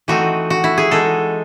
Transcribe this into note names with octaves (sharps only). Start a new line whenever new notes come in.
E3 A3 C4 D#4 F#4
F#4
E4
G#4
E3 G#3 D#4 A4